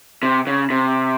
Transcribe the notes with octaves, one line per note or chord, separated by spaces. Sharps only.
C3
C#3
C3